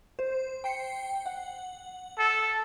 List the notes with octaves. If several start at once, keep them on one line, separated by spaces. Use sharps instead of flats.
C5
G5 C7 C#7
F#5
A4